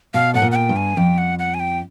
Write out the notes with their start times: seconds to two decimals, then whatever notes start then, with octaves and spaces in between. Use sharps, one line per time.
0.14 B2 F5
0.34 A2 F#5
0.42 A#2
0.51 F#5
0.55 G5
0.69 G2
0.76 G#5
0.97 F2 G5
1.18 F#5
1.39 F#5
1.54 G#5
1.60 G5